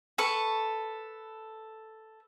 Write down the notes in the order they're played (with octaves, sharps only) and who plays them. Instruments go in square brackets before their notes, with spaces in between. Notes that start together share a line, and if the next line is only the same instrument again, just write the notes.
[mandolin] A4 B4 C#6